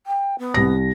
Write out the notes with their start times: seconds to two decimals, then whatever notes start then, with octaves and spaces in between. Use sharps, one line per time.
0.06 G5
0.39 B3
0.54 C2 A#6